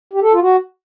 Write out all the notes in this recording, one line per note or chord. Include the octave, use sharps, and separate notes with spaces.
G4
A4
F4
F#4